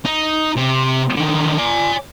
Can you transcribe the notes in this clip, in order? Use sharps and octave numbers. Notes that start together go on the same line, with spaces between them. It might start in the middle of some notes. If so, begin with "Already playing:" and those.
D#4
C3
D3 D#3
D5 G#5